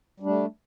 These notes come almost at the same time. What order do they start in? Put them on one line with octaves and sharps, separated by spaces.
G3 D4 A3